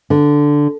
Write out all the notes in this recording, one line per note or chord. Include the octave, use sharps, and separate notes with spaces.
D3